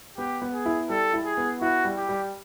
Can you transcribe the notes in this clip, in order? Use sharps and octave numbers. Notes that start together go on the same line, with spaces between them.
B3 G4
B3
G#4
E4
G3 A4
E4
G#4
B3
E4 F#4
G3
G4
G3